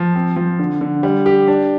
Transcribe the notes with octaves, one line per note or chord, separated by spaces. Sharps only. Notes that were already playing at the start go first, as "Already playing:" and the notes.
Already playing: F3
C4
F3
D3
D3
G3
G4
D4